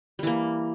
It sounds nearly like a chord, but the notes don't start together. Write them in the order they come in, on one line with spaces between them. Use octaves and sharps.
G3 E3 A#3